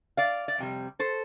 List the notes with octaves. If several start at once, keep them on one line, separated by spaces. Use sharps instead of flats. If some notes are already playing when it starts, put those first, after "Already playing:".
D5 F5
D5
F2 C3 G3
A4 C5